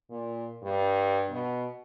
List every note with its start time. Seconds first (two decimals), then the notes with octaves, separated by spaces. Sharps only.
0.10 A#2
0.63 G2
1.30 B2